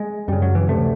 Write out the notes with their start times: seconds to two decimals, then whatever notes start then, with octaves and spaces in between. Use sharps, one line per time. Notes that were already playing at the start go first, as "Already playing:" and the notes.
Already playing: G#3
0.28 F#2 C#3 G3
0.42 F#3
0.55 E3
0.68 D2 C3 A3